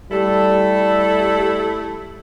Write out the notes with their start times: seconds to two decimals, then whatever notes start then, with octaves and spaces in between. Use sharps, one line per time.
0.12 G3 A3 E4 A4